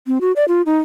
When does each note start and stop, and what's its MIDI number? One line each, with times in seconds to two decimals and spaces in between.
0.07 0.18 60
0.21 0.32 66
0.36 0.45 74
0.48 0.62 65
0.66 0.78 63